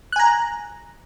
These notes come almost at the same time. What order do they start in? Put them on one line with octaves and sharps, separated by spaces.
F#6 G#5 A#5